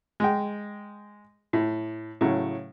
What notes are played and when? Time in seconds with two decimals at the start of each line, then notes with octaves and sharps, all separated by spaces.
0.20 G#3 G5
1.53 A2
2.21 A2 C#3 F#3